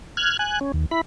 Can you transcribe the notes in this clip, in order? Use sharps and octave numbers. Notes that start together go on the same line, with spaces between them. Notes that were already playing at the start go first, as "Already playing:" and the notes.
F6 F#6 G#6
G#5 F#6
C#4
D#2
E4 B5